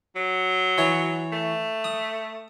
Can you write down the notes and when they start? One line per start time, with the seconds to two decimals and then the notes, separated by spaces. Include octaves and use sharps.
0.16 F#3
0.78 E3 C#5
1.32 A3
1.84 D#6